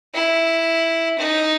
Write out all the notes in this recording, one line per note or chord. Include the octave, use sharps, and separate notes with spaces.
E4
D#4